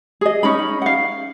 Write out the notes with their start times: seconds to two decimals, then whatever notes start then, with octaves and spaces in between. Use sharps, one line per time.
0.21 G#4 D#5
0.43 C#4 D#4 B5
0.82 F5 F#5